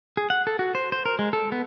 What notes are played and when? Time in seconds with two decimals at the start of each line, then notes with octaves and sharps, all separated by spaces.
0.17 G#4
0.30 F#5
0.47 A4
0.59 F#4
0.75 C5
0.92 C5
1.06 A#4
1.19 G#3
1.33 A4
1.52 B3